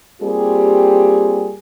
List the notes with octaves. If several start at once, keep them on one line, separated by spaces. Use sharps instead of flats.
G3 A#3 C4 F4 G4 G#4